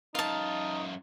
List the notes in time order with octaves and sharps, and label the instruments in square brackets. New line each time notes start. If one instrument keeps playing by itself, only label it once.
[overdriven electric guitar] F#2 F4 [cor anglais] D#4 [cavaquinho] F5 A5